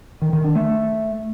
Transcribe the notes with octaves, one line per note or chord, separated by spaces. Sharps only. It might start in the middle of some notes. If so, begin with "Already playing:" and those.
D#3
D#3
D4
A3